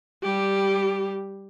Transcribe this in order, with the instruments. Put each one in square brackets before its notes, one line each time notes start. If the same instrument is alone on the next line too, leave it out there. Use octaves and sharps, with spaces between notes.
[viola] G3 G4